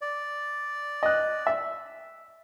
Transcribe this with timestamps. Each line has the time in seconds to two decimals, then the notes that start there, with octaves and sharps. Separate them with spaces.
0.01 D5
1.03 D#5 F#6
1.47 E5